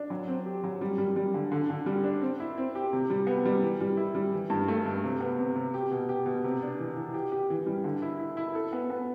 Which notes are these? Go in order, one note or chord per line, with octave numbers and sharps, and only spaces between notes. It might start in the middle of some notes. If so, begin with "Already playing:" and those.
Already playing: D4
F#3
C4
G4
F#3
G3
G3
G3
D3
D3
D3
G3
D4
C4
E4
C4
G4
C3
G3
B3
G3
E3
G3
E4
G3
E3
G2
A3
G2
C3
B3
C3
C3
G4
B2
G4
B2
C3
D4
E3
E3
G4
G4
E3
G3
D3
E4
E4
E4
A4
B3
B3